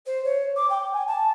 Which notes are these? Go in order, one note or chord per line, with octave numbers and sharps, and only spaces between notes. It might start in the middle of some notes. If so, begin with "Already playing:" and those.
C5
C#5
D6
G5
G#5
A5